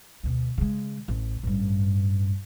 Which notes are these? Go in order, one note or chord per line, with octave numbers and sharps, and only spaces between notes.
D2 B2
C#3 G#3
A1
A1 G2